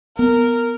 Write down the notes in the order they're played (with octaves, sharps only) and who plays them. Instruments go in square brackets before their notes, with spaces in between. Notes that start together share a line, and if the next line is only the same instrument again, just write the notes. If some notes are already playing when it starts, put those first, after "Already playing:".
[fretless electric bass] B3 [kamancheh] A#4